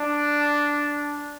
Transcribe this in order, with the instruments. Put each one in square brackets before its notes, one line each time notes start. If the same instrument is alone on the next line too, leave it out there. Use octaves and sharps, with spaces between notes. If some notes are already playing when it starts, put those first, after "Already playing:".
Already playing: [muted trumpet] D4